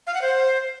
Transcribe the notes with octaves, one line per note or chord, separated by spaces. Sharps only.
F5
F#5
C5